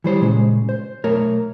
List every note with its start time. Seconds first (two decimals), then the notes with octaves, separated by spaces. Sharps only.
0.04 E3 G3 C5 C#5
0.21 A#2 C#3 G#3
0.69 C5
1.04 B1 A3 A#4 C#5